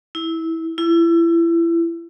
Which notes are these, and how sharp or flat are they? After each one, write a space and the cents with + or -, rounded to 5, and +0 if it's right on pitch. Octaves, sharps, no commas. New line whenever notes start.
E4 -15
E4 +30